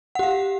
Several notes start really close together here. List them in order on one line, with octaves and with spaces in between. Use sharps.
F#5 G4 F5